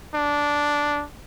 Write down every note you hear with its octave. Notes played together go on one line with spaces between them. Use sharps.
D4